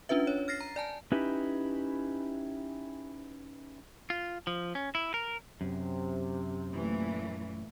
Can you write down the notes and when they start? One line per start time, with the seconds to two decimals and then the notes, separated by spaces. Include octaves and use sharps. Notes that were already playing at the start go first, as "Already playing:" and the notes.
0.09 C#4 D4 F4 B4 E5
0.27 C#5
0.48 F6 A6 A#6 C7
0.61 A#5
0.76 D5 G#5 A5
1.12 C#4 D#4 E4 G4 B4
4.10 F4
4.47 F3
4.75 C#4
4.95 E4
5.14 A#4
5.61 F#2 C3
6.72 A#2 E3 A3